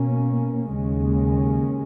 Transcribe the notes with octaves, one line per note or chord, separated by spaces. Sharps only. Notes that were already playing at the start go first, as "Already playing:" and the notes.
Already playing: B2 A#3 C#4
D#2 C#3 G#3 C#4